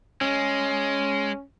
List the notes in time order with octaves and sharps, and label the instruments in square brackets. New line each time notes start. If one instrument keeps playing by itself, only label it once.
[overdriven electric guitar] G#3 [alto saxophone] C#4